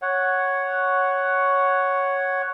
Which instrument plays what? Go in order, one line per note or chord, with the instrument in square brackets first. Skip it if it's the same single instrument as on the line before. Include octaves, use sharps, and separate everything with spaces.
[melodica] C#5 F#5